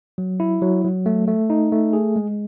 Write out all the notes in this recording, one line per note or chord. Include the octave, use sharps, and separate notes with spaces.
F#3
E4
F#3
F#3
A3
A3
D#4
A3
G#4
G#3